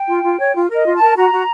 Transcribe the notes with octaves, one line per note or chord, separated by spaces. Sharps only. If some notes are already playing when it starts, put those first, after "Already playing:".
Already playing: G5
F4
F4
C#5
F4
A#4
D#5
F4
A5
A#4
F#4 A#5
F#4